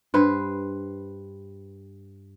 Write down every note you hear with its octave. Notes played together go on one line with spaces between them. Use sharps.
G2 B4 C5